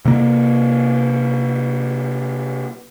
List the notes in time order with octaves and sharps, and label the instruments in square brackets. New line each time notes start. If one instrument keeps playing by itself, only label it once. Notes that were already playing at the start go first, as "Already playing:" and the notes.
[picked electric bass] C3 A#3